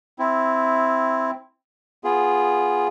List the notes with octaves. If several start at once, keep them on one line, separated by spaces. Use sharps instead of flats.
C4 E4
B3 F4 G#4